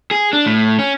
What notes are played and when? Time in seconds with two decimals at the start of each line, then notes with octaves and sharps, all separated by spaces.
0.11 G#4
0.33 D4
0.46 A2
0.79 C#4